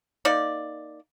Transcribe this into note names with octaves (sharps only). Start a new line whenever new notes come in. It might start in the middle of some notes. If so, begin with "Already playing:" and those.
A#3 D#4 D5